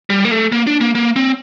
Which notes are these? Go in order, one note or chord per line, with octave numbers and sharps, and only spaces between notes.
G3
A#3
A3
A#3
D4
A#3
A#3
C4